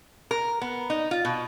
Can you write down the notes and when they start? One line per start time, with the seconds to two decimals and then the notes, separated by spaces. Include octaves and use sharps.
0.31 A#4
0.61 B3
0.90 D#4
1.11 F4
1.25 B2